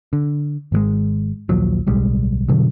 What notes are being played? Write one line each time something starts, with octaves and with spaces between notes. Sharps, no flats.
D3
G#1 E3 G#3
A#1 D#2 F3 F#3
D1 B1 G3 G#3
G2 B2 D3 F#3